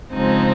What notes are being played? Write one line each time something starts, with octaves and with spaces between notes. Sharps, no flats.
C#3 F3 G#3 C4 D#4